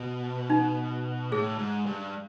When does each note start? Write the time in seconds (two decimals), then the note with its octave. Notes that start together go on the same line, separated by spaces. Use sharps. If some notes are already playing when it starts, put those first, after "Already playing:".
Already playing: B2
0.50 D#4
1.31 A2 G#4
1.59 G#2
1.86 G2